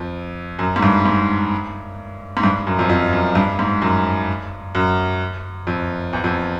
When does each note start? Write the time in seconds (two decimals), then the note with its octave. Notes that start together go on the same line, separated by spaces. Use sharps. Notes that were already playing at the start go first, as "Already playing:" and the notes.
Already playing: F2
0.59 F#2
0.76 G#2
0.83 G2
1.06 G#2
2.37 G#2
2.43 G2
2.67 F#2
2.79 F2
2.89 F2
3.13 F#2
3.35 G2
3.59 G#2
3.82 F#2
4.75 F#2
5.67 F2
6.13 E2
6.24 F2